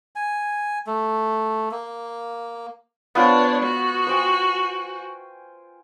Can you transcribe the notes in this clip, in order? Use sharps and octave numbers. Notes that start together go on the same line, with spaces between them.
G#5
A3
A#3
B3 D4 F4 C5 C#5
F#4
C5 G5 G#5